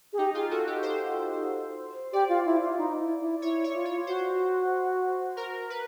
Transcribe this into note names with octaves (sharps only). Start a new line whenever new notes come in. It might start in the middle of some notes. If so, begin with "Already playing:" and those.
G#4
D#4 G4
F4 G#4
F#4 A4
G4
A4 C5
G4 D5
F4
E4
F4
D#4
E4
E4
E4 C#5
C#5
F4
C#5
F#4 C5
A#4
B4